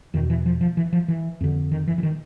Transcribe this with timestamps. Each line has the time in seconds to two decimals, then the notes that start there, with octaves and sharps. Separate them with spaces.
0.14 E2 D#3
0.18 B2
0.30 E3
0.46 F3
0.61 F3
0.77 E3
0.93 F3
1.08 E3
1.41 F2 D3
1.72 D#3
1.88 E3
1.98 E3
2.03 D#3